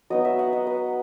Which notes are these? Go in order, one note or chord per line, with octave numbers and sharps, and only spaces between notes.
F#3 B3 D#4 D#5
E5
F#5
D#5
B4